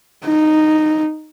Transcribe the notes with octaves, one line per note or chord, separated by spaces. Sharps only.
D#4